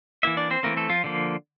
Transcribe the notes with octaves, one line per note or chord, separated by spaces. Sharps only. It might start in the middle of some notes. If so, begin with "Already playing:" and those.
E3 A#3 E4 E5
D4 D5
C4 C5
E3 A3 A#3 C4 A#4
A3 A4
F3 F4
D3 F3 A#3